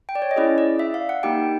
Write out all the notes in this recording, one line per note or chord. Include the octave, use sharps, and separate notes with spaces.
G5
D5
C#5
D#5
C#4 E4 G#4 D5
D5
E5
F5
F#5
A#3 D#4 G4 G5